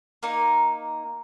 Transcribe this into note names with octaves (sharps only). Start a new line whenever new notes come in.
A#3 D#4